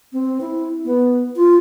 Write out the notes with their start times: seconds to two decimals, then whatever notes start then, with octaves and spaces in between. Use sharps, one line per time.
0.13 C4
0.41 E4
0.85 B3
1.36 F4